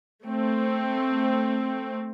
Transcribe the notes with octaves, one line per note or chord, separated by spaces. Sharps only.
A3 C4